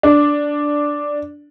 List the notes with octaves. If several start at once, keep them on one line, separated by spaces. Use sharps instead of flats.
D4